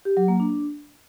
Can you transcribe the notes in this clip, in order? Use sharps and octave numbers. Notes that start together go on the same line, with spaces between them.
G4
F#3
A#3
D4